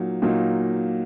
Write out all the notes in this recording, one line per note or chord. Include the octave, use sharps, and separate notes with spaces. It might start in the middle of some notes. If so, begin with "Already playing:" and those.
Already playing: A#2 F#3 A#3 D#4
A#2 F#3 A#3 D#4